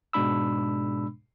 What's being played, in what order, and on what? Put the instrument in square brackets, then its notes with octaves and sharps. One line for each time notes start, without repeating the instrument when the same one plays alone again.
[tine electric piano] G#2 B2 G#3 D4 B5 E6